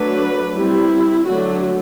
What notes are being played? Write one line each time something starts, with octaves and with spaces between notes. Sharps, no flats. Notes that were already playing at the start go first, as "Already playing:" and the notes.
Already playing: F#3 A3 D4 B4
G3 C4 E4
D3 F#3 A3 F#4